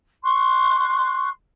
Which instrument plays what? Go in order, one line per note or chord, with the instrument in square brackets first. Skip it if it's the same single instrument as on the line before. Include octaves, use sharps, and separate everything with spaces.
[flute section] C6 C#6 F#6